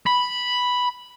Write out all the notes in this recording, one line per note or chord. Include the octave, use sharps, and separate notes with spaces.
B5